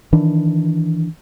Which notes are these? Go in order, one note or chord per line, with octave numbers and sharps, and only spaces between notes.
D#3 E3 D4